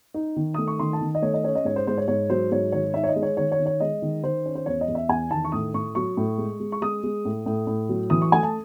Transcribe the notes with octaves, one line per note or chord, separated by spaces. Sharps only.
D#4
D#3
A3 D#6
C#6
D#3 C6
A5
D#3
D#5
A3 C#5
D#5
C#4 C#5
D#5
G#2 C#5
C5
G#2 C5
C#5
G#2 C#5
F#3 C5
G#2 C#5
D#3 C#5
D#4 E5
C#5
D#5
G#3
C#5
D#3 C#5
C#5
D#3
C#5
G#3 D#5
D#3
D#3 C5
C#4
C5
E2 C#5
D#5
E2
E5
E2 G#5
D#3 A5
C#6
A2 D#6
A2 C#6
F#3 C#6
A2
G#3
G#3
C#6
G#3 D#6
G#3
A2
A2
A2
F#3
E3 D#6
C#6
A3 G#5
A5